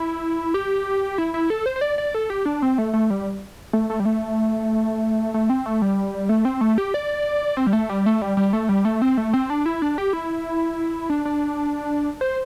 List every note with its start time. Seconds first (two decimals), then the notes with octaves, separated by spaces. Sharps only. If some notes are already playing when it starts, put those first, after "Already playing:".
Already playing: E4
0.54 G4
1.18 E4
1.34 E4
1.50 A4
1.66 C5
1.76 C5
1.81 D5
1.98 D5
2.14 A4
2.30 G4
2.46 D4
2.62 C4
2.78 A3
2.93 A3
3.10 G3
3.73 A3
3.90 A3
4.00 G3
4.05 A3
5.34 A3
5.50 C4
5.66 A3
5.82 G3
6.29 A3
6.45 C4
6.61 A3
6.78 G4
6.94 D5
7.57 C4
7.67 G3
7.73 A3
7.89 G3
8.06 A3
8.22 G3
8.37 G3
8.53 A3
8.69 G3
8.85 A3
9.02 C4
9.17 A3
9.33 C4
9.50 D4
9.66 E4
9.82 D4
9.98 G4
10.13 E4
11.10 D4
11.25 D4
12.21 C5